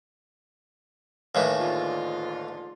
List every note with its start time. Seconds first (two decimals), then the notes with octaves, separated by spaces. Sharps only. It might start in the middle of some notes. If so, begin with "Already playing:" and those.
1.35 D#2 A2 E3
1.59 G#2 D3 F4